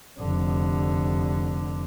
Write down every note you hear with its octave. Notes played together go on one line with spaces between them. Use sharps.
F1 D3